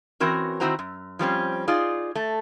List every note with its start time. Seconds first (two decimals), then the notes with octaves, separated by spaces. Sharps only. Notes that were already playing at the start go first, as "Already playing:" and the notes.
0.20 E3 C4 C#4 F#4 A#4
0.60 D#3 C4 E4 F#4 C5 A#5
0.79 F#2
1.19 F3 G3 C4 C#4
1.68 D#4 F4 G#4 D5
2.15 A3